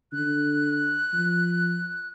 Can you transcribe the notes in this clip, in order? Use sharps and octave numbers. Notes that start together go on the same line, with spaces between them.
D3 F#6
F3